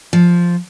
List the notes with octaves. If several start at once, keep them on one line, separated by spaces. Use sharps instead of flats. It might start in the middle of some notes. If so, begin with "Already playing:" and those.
F3